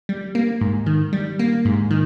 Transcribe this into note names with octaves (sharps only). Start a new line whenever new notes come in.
G3
A#3
G#2
D#3
G3
A#3
G#2
D#3